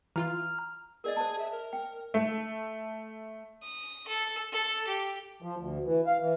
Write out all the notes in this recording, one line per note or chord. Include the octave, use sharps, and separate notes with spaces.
E3 F4 A#5 F6
G#4 A#4 D5 D#5
C5 A5
E5
A#4
G5
A3
D#6
A4
A4
G4
F3
D2
E3
F5
E3